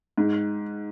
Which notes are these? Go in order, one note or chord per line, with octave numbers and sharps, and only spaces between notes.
G#2